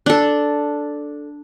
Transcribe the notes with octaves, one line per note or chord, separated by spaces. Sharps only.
D4 A4